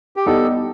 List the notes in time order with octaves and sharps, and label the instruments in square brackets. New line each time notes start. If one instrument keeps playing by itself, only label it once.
[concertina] G4
[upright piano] G3 B3 D#4 [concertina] A4